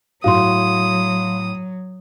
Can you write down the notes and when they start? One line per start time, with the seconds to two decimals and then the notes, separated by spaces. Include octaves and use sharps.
0.24 A2 F#3 F#4 F5 C6 D#6